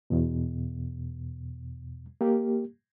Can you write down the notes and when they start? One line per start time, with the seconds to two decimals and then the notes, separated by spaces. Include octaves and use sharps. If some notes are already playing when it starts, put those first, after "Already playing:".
0.10 E2 B2
2.21 A#3 G4